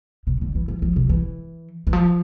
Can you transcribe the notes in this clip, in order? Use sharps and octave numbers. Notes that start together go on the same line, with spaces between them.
C3
D3
E3
F3
F3
C3
E3
E3
F3